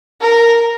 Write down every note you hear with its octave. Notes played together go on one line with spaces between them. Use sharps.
A#4